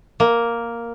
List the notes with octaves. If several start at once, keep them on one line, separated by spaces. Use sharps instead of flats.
A#3